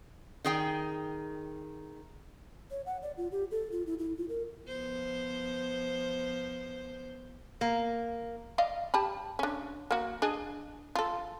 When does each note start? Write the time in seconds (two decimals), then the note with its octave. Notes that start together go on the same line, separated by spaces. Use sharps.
0.44 D#3 G#4 G5
2.71 C#5
2.86 F#5
3.02 D5
3.17 F4
3.32 G4
3.51 A4
3.72 F4
3.87 E4
3.99 E4
4.17 F4
4.29 A#4
4.68 F3 B3 C5
7.61 A#3
8.58 D5 D#5 F5
8.94 G4 A5 B5
9.39 C#4 D4
9.91 A#3 F#4
10.22 D4 G#4 D#5
10.95 F4 A4